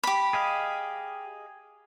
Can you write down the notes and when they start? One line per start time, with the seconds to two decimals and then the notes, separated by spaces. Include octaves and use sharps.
0.04 G4 B5
0.33 G#4 D#5 F5